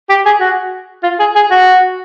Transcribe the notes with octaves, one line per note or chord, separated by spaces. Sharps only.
G4
G#4
F#4
F4
G#4
G#4
F#4